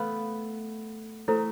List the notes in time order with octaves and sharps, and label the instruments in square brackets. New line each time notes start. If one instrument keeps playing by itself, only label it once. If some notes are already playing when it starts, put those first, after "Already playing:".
Already playing: [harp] A3 B3 [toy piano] B4 F5 B5
[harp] A3 [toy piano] E4 A4 C5